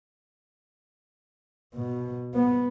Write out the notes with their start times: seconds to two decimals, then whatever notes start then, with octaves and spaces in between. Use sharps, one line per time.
1.75 B2
2.34 B3